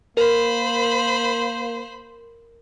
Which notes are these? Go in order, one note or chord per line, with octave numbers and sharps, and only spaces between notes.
A#3 A#4 C5 B5